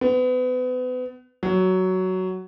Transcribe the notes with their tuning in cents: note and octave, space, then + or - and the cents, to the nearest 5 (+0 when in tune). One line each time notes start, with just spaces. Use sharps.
B3 +35
F#3 +10